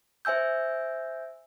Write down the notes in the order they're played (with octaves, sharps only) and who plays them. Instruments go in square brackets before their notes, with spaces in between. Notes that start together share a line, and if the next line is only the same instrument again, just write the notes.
[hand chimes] C5 E5 G#5 E6 G6